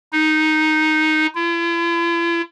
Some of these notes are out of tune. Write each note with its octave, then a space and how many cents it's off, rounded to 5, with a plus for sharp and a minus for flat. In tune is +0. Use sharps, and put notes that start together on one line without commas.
D#4 +0
E4 +45